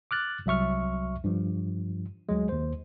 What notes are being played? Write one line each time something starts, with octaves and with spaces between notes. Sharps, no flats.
D6 F6 F#6 A6
C2 F#3 E5 C#6 F6
G2 F3
D2 F#3 G#3
D#2 C5